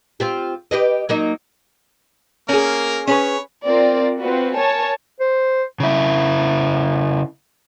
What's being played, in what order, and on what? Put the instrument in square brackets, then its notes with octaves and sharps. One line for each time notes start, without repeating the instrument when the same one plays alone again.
[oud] C4 F4 G4
G4 B4 D#5
F#3 A#3 D#4
[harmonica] A#3 A#4 [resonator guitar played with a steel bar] C#4 G#4
[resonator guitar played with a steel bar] C#4 G#4 B4 [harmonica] C#5
[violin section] C4 F4 A#4 D5
C4 F4 F#4 B4
A#4 C#5 G#5 A5
[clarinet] C5
[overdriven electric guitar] C#3 E4